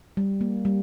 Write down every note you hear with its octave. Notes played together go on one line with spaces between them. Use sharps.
G3
A#3
G3